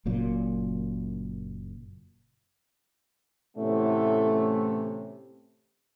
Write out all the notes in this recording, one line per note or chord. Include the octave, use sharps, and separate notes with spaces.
F#1 F#2 A#2
A2 C3 E3 A3 B3 C#4